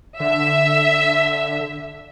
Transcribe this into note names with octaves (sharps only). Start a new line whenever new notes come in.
D3 E5